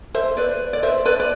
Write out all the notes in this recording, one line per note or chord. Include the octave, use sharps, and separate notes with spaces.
C5 E5
B4 D5
D5
C5 E5
B4 D5
D5